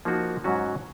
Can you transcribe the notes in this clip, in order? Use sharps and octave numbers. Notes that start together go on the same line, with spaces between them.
F3 A#3 D#4 F#4
G#2 F#3 C#4 F#4